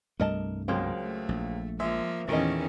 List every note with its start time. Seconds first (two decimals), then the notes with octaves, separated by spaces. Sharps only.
0.20 C2 G2 A3 A#4 D#5 A5
0.68 C#2 F#3 G#3 A#3 C4
1.00 A3
1.29 A#1
1.80 F3 G#3 A#3 E5
2.29 E2 A#2 D#3 A3 C#4 A#4 D#5